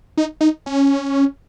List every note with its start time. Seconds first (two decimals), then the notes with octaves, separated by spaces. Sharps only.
0.17 D#4
0.41 D#4
0.66 C#4